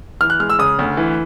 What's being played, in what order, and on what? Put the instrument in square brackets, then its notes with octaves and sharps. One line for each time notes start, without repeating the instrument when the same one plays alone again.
[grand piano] E3 F6
F#6
G#3 F6
E6
C#3 D#6
D2
E3